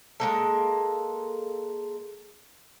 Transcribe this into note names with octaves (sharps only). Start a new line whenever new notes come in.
G#3 A#3 A4